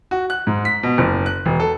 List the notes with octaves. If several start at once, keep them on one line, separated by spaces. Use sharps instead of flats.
F#4
F#6
G#2
B6
B2
F#1
F#6
E1
A4